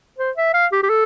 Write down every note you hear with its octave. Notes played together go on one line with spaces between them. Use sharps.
C5
E5
F5
G4
G4
A4